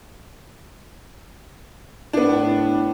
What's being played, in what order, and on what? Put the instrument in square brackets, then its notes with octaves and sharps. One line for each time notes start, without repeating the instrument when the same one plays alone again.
[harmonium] A2 [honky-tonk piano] B3 D4